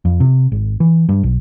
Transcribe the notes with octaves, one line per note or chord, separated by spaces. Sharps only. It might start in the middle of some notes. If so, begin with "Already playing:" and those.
F2
C3
G#1
E3
G2
B1